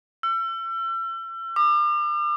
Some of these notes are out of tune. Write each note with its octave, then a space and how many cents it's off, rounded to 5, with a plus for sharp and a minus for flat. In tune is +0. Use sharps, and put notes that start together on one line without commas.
E6 +40
D6 +35